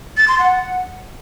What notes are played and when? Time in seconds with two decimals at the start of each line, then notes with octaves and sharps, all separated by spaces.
0.17 A6
0.28 C6
0.39 F#5